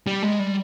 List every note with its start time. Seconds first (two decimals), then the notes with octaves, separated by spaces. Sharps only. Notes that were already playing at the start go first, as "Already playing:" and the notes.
0.07 G3
0.23 G#3
0.39 G3